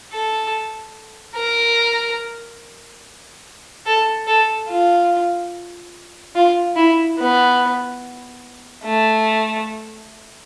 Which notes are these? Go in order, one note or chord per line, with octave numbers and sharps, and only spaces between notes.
A4
A#4
A4
A4
F4
F4
E4
B3
A3